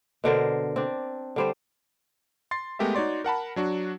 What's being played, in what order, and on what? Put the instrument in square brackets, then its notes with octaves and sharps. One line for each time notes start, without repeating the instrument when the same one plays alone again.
[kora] B2 D3 A#4 C5
C4 D4
D3 G3 C5
[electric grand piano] C6 A6 C7
G#3 A3 B3 G4 A#4 E5
D#4 F#4 C#5 D5 C6
A#4 F#5 A5 B5
F#3 D4 F#4